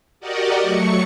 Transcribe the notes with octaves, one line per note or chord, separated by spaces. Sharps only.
F#4 G4 A#4 D5 D#5 F#5
F#3 A3 C#6 C#7